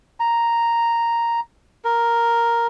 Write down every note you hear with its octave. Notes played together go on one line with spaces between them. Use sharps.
A#5
A#4